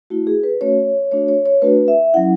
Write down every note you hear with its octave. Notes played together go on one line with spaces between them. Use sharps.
A3 E4 F#4
G#4
B4
A3 C#4 F#4 C#5
A3 D4 F#4 C#5
C#5
C#5
A3 D4 F#4 B4
E5
F#3 C#4 E4 F#5